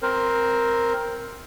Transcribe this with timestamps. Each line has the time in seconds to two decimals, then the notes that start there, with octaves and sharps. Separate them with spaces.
0.02 C4 A#4 C5